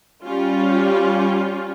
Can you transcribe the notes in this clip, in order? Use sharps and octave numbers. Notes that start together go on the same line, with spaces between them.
G3 C#4 F4